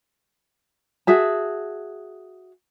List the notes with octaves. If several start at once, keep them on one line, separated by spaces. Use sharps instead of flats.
F#4 G#4 E5 A5